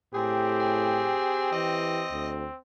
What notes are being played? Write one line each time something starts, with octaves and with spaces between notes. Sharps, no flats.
A2 C4 G4 G#4
G#4
E3 D#5
D2